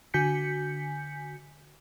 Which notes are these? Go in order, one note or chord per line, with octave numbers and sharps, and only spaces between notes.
D3 F#4 G#5 G6 B6 C#7